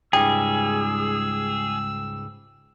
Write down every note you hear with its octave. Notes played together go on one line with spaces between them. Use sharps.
C#2 G#2 G3 G#4 G5 E6